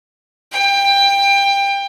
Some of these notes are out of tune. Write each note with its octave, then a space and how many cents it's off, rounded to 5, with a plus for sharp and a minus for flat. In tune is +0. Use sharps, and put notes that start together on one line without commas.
G5 +20